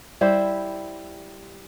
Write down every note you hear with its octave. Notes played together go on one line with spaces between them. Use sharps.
G3 E4 G4 C5